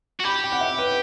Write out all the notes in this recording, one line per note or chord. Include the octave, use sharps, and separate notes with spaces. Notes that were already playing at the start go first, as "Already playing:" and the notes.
F#4
G4 B5
G5
F#5
E5
B4